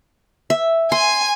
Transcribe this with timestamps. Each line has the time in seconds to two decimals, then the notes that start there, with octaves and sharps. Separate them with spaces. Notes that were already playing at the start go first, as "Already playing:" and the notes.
0.50 E5
0.92 G#5 C6